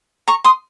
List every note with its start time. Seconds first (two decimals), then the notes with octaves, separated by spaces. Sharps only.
0.28 A#5 C#6
0.44 C6 D#6